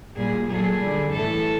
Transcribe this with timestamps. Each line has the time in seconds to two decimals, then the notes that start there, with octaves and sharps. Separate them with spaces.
0.16 A#2 G3 G#4
0.48 A#2 F#3 A3 G#4
0.80 D3 G3
1.13 A2 E3 A3 A4